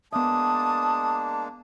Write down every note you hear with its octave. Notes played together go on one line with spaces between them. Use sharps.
G#3 A#3 B3 D4 E5 A5 D#6